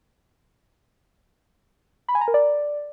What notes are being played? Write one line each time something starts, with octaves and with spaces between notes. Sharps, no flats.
B5
G#5
A#5
A#4
D5